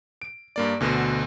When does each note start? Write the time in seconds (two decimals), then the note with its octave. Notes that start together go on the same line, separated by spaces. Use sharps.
0.22 D7
0.56 G2 A#3 D5
0.80 D2 B2 D3